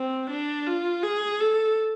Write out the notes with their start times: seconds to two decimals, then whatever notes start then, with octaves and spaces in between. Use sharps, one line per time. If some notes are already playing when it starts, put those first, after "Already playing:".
Already playing: C4
0.30 D4
0.67 F4
1.03 G#4
1.40 A4